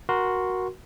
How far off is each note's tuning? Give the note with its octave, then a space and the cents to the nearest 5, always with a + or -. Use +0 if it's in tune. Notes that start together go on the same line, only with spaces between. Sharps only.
F#4 +0 A#4 +15 C6 +0